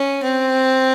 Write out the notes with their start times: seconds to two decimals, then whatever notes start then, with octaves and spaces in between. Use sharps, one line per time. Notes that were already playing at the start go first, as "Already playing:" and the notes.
Already playing: C#4
0.23 C4